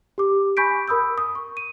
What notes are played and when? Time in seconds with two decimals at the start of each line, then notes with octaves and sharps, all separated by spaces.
0.18 G4 D6
0.57 G#5 B5 C#6 G6 B6 D7
0.88 A#4 B5 D#6 E6 G6
1.18 D#6
1.35 C#6
1.57 D#7